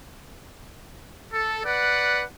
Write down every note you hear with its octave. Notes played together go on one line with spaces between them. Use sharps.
A4
B4 D5 F#5